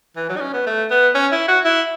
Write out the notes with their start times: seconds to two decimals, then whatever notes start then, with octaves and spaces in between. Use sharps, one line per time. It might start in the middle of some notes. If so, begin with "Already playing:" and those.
0.16 E3
0.29 F#3
0.37 D#4
0.41 C#4
0.53 B3
0.66 A3
0.90 B3
1.15 C#4
1.32 E4
1.48 F#4
1.65 E4